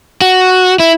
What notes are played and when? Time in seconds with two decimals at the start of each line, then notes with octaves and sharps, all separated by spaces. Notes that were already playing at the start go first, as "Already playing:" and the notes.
0.21 F#4
0.80 E4